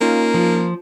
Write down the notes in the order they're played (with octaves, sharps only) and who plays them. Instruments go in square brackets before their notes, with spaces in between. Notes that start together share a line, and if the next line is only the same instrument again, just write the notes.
[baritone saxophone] A#3 [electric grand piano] C#4 D#4 F4
[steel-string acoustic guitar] F3